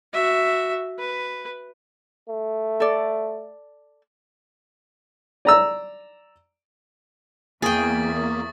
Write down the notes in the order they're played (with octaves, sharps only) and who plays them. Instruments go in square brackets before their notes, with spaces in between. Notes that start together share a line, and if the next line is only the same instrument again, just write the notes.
[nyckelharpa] F#4 E5
B4
[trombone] A3
[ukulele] A4 D5
[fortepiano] D5 A#5 E6
[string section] E2 E5 [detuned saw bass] A#3 [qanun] G#4 G5 [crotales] C#6 D#6 A6